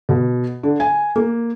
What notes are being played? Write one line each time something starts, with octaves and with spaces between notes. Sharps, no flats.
B2
D3
G#5
A#3